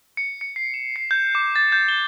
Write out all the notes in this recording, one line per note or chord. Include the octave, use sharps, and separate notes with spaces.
C#7
C#7
C7
E7
C7
G6
D6
A6
G6
G7